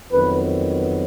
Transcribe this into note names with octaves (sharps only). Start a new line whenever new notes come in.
F2 D#3 F#3 B3 B4